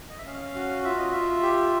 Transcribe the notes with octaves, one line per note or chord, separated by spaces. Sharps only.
D#5
E5
C#4 F5
F#4
F4 E5
D#5
F4 E5
G4